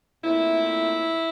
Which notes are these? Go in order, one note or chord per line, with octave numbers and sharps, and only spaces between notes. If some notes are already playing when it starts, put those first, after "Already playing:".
A#2 A3 C4 E4